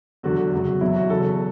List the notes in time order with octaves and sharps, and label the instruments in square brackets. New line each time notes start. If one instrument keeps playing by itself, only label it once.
[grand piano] E2 D3 F#3 F#4
F#2 C#3 F#3
E2 B2 F#3 E4
F#4
E2 C#3 F#3 A4